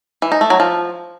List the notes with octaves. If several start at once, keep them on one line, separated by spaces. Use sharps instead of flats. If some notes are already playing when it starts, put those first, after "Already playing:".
E3
D#4
A3
F#3
F3